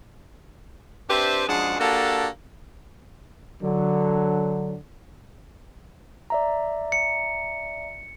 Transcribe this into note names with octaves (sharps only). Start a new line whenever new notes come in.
C4 D4 G4 B4 C5 E5
F#2 F3 G#3 D4 G#4 F#5
A#3 D4 F#4 G4 A4
D3 F#3
D5 E5 A#5
C#7